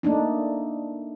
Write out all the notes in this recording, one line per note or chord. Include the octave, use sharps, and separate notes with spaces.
A3 A#3 D4 D#4